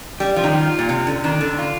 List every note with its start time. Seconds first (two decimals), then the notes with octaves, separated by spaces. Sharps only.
0.20 G3 G4
0.36 F3
0.44 D#3 D#4
0.55 F4
0.79 A#2
0.89 C3
1.07 D3
1.24 D#3 D4
1.41 D3
1.58 F4